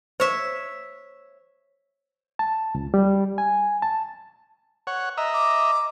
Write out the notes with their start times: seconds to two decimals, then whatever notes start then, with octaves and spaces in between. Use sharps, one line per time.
0.20 C5 C#5 E5
2.39 A5
2.75 C#2
2.94 G3
3.38 G#5
3.82 A5
4.87 C#5 F#5
5.17 D#5 E5 A#5
5.34 D6